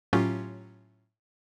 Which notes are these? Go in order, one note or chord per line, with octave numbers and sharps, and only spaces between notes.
A2 F#3 C#4 F4 G4